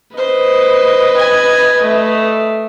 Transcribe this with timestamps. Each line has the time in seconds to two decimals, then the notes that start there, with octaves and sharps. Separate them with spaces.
0.17 B4 C5 D#5
1.17 G#5
1.82 A3